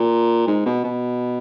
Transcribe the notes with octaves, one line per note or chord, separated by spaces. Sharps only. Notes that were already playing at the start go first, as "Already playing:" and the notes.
Already playing: A#2
G#2
B2
B2